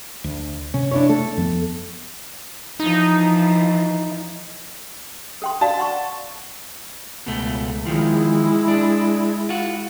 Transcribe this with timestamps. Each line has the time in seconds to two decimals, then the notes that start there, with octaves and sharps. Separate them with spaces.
0.24 D2
0.74 C3 C#4
0.91 D4 E4 C#5
1.09 A3 A4
1.37 F2 F3 B3
2.80 E3 F3 D#4
5.42 A4 G5 C6
5.61 F#4 D5 F5 A5
5.78 F#5 C6 C#6
7.27 C#2 B2 A3
7.86 E2 D#3 F3 G#3 E4
8.68 D4
9.49 F4 F#4